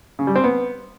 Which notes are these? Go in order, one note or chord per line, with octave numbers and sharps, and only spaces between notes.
C#3
G3
C4
B3